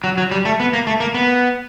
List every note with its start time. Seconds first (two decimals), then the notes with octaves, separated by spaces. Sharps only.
0.04 F#3
0.18 F#3
0.31 G3
0.45 A3
0.60 B3
0.73 A#3
0.87 A3
1.00 A#3
1.14 B3